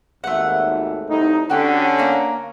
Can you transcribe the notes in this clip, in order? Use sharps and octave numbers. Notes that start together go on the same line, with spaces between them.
G#1 D#2 A3 F#5
C2 A2 D#4
D3 C#4 F#4 G4
A#3 A#5